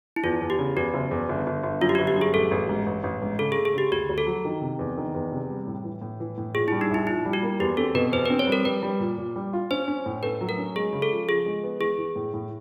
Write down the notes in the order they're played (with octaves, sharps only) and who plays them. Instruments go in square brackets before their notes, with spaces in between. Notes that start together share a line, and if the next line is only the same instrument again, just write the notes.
[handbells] E4
[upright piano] E2 [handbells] F4
[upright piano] E2
[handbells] G4
[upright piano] C#3
[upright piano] E2 [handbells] F#4
[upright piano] F#1
E2
G1
G1
G1
[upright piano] F#2 [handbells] F4
[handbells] G4
F#4
[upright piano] G1
[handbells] G4
[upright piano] F#2
[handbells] G#4
[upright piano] A1 [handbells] A4
[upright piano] A1
G#2
A1
A1
G#2
[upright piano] C#3 [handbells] A4
[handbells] G#4
[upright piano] A3
[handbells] G#4
[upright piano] C#3 [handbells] G4
[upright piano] D2 [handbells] F#4
[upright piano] D2
[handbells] A4
[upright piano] F#3
D#3
C3
E2
D#3
E2
C3
G3
A2
E3
A2
E3
A2
[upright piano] A#2 [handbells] G#4
[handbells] E4
[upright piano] G3
[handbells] D#4
[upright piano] A#1 [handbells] E4
[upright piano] A#2 [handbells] E4
[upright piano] G3
[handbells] F#4
[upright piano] A#3
[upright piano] E2 [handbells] G4
[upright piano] C4 [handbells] A4
[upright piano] B2 [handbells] B4
[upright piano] E2 [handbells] C5
[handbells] B4
[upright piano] C4
[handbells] C#5
[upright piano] G3 [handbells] A#4
[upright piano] G3 [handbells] B4
[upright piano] G3
A#2
A#2
G3
F4
[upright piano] C#4 [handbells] C5
[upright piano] C#4
A2
[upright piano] A3 [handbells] B4
[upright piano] F#3
[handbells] A#4
[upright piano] C#4
[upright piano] G#3 [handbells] G#4
[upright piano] C#3
[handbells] A4
[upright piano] F3
[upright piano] F3 [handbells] G#4
[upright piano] G#3
B3
[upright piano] E3 [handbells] G#4
[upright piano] E3
A2
A2